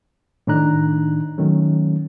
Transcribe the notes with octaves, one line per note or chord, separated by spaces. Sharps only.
A2 D#3 D4 D#4 A#5 F#6
D#3 F#3 A3 C#4